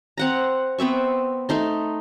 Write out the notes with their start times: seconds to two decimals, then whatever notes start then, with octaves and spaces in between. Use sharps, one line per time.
0.18 C4 F#5 A#5
0.78 B3 C4 E5 C#6
1.49 A3 D#4 C6